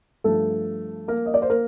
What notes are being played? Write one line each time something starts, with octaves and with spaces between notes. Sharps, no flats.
G2 F3 A3 A4
A#3 A#4
D#5
D5
C5
A#3 A#4